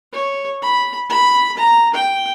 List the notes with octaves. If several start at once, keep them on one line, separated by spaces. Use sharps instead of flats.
C#5
B5
B5
A#5
G5